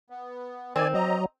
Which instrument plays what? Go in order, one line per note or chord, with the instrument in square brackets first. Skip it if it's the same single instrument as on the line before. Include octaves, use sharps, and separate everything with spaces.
[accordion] B3
[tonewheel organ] D#3 [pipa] C4 [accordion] D5 G#5
[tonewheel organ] F#3 [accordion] D#5 A#5